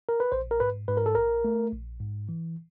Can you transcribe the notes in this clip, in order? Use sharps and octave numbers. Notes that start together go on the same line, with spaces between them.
A#4
B4
A#1 C5
A#4
G#2 B4
G#2 B4
A#4
A4
A#1 A#4
A3
A#1
G#2
E3